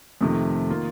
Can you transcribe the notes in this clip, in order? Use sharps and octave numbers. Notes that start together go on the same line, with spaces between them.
F2 C3 D#3 A3
D#3 A#3 F4